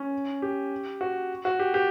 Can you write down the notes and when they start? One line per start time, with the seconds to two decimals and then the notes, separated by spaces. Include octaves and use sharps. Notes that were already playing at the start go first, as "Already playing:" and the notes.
Already playing: C#4
0.42 G4
1.01 F#4
1.45 F#4
1.59 G4
1.74 G4